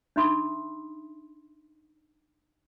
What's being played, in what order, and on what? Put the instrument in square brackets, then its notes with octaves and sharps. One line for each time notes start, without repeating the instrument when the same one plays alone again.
[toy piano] D4 D#4 E5 B5 C6 D#6